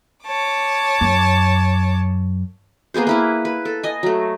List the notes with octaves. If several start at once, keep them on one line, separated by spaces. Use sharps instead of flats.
C#5 A5 D6
F#2
A#3 B3 G#4 C5
A#3 E4 B4
B4
A4
D#5 G#5
F#3 A3